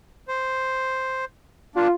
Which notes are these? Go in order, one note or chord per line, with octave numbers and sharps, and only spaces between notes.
C5
A#3 D4 F4